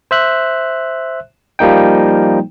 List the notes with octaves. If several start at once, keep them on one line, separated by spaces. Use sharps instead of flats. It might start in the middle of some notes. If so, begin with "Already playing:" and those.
C5 E5 F#6
F3 G3 A#3 D#4 G5